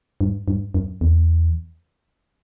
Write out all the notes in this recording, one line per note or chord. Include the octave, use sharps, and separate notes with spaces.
G2
G2
F#2
E2